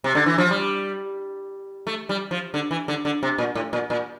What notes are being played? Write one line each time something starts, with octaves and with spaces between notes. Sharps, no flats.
C3
D3
E3
F3
G3
A3
G3
F3
D3
E3
D3
D3
C3
A#2
A2
A#2
A#2